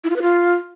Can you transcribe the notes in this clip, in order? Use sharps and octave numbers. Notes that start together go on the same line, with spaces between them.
E4
F4
B4
F4